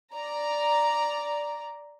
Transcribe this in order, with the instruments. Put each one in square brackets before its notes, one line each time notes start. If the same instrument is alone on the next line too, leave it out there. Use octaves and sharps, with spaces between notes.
[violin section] D5 A#5